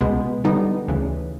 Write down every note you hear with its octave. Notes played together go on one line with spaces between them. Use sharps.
C#2 B2 G#3 B3
D3 G3 B3 D#4
D2 C#3 E3